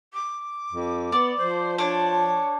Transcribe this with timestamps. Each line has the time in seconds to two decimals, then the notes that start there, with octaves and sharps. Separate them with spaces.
0.14 D6
0.72 F2
1.12 B3 D5
1.37 F3 C5
1.78 D4 C#5